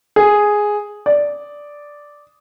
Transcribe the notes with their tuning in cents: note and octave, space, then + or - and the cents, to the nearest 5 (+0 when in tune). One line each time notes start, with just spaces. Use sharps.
G#4 +0
D5 -5